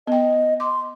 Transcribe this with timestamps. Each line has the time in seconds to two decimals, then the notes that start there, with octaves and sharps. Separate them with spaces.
0.07 B3 D#5 G5
0.60 C6 D6